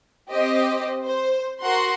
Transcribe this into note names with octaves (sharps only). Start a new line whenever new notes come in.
C4 G4 C5 D#5
C5
F#4 A#4 F#5 C6